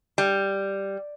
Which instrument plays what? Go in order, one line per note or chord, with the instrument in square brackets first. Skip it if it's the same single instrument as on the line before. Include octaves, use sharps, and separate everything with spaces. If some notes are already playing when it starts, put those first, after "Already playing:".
[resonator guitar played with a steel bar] G3